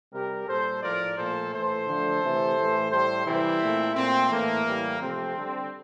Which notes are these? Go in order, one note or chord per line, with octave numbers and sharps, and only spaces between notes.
C3 G3 G4 A#4
A#2 G3 A4 C5
A2 F3 A3 A#4 D5
A#2 F3 A3 A4 C5
A2 E3 A3 A4 C5
D3 F3 A3
C3 E3 A3
A2 E3 A3
A2 G3 A4 C5
C3 E3 G3 C4 E4
A#2 A3
A#2 A3 C4
A2 E3 A3 A#3
A2 E3 G3
C3 F3 A3 C4
D3 G3